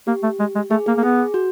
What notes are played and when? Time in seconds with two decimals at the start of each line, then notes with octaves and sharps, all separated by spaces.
0.07 A#3 G4
0.23 A3
0.39 G#3
0.55 G#3
0.71 A3 G#4
0.86 A#3 G#4
0.98 A#3
1.03 B3 G#4
1.34 F#4